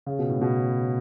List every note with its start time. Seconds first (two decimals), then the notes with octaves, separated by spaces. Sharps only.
0.06 C#3
0.19 B2
0.29 A2
0.41 B2